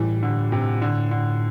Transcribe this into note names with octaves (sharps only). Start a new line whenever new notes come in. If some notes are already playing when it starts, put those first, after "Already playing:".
Already playing: A2 E3 G3
D3
C3
D3
D3